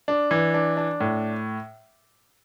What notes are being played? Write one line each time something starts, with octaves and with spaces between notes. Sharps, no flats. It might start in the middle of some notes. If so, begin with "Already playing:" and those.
D4
E3
D4
D4
A2